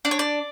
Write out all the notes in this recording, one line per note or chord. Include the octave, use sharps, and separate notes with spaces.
D4 D5
C#5
D5